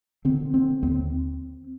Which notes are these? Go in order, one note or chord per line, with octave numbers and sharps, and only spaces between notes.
D3 C4
D3 C4
D#2 C4